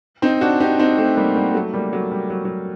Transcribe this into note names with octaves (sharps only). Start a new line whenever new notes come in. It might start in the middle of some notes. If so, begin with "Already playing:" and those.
C4 D#4
D4 F#4
D#4 G4
C4 D#4
A3 C4
G3 A#3
G3 A#3
F#3 A3
G3 A#3
F#3 A3
G3
F#3
F#3